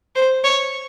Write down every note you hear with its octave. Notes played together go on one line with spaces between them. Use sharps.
C5
C#5